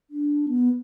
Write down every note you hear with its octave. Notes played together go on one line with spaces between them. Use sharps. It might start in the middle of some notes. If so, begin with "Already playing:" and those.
D4
B3